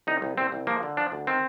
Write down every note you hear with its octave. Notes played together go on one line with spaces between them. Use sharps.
C2 D#4
C2
C2 C4
C2
F3 A#3
D3
F3 D4
D2
D#3 C4